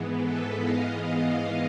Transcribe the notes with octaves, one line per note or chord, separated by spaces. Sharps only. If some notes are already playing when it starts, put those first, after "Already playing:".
Already playing: G#2 E3 G#3 B3
A4 B4
D#5 F5
D#5 F5